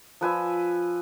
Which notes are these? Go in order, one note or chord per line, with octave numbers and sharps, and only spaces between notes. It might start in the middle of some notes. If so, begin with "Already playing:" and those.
F3 B4 G#5 E6